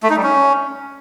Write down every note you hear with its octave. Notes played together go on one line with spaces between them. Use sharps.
A3
D#4
G3
C#4